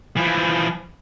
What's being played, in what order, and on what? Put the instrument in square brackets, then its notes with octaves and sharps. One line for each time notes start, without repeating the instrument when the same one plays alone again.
[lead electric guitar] E3 F3